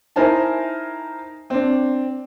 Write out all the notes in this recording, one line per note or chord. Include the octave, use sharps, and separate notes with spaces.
D#4 E4 A#4 C5 G#5 A5
C4 D4